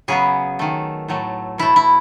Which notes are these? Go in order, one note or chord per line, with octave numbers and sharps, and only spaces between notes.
C#3 F#3 B3 G#4
D#3 A3
A2 F#3 A3
B2 A3 E4
E4